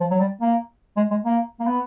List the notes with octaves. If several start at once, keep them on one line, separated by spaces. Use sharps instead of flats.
F3
F#3
G3
A#3
G#3
G#3
A#3
A#3
B3